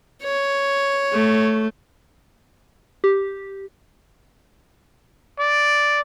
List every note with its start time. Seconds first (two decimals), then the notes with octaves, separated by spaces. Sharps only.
0.23 C#5
1.12 A3
3.04 G4
5.39 D5